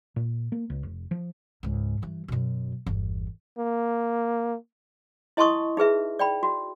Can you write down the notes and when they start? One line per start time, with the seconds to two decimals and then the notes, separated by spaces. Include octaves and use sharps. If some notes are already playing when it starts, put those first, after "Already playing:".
0.16 A#2
0.52 A#3
0.70 C#2
0.83 F1
1.11 F3
1.63 C#2 G#2
2.02 G2 E3
2.28 F#2 B2
2.86 G1 E2
3.59 A#3
5.37 E4 D#5 A5 C6 C#6 D#6
5.77 D#4 G#4 B4 E5
6.19 D5 G5 B5
6.43 F#4